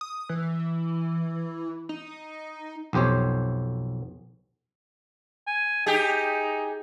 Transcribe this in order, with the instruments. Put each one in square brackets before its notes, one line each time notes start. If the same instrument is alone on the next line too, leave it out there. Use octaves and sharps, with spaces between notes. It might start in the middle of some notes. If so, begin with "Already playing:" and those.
[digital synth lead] D#6
E3
D#4
[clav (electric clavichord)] B1 F2 G4 C5 C#5
[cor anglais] G#5
[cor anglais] D#4 [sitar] G4 G#4